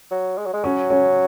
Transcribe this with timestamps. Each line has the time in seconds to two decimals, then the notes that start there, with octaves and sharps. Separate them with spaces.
0.11 F#3
0.38 G#3
0.46 F#3
0.53 G#3
0.64 F#3 C#4
0.90 C#4